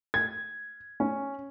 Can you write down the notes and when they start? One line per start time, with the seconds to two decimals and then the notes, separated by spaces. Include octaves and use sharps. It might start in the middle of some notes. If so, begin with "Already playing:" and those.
0.14 G#6
1.00 C#4